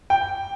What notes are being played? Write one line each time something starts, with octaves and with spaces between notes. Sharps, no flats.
G5